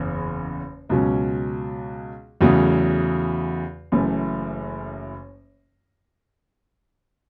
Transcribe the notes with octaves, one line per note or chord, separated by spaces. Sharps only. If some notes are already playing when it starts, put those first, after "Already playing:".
Already playing: F#1 E2 C#3
C#2 B2 F#3 C#4
E2 C#3 F#3 A3
F#1 F#2 E3 A3